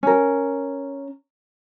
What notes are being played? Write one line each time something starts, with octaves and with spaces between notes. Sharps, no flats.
C#4 A#4